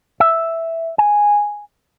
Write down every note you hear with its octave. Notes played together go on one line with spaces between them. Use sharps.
E5
G#5